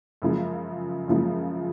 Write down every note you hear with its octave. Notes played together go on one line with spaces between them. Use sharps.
F#2 C#3 F3 G#3
F#2 C#3 F3 G#3